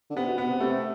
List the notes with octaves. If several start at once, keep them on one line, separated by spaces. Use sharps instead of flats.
D3
C3 B3
B2
B3
C3
C3 A3